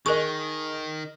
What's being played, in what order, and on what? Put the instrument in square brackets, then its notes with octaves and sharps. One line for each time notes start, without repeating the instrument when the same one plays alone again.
[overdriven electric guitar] D#3 [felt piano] G#4 D#5 [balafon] A#4 C#6